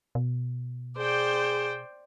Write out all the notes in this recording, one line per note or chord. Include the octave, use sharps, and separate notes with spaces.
B2
G#4 C5 D5 G5